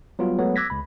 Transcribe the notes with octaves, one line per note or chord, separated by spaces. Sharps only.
F#3 G3 B3 F4
F#3 G#3 A3 B3 A4 C#5
D6 E6 F#6 G#6 A#6 B6
C#2 B5